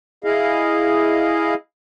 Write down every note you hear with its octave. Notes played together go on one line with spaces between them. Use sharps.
E4 G#4 D#5 F5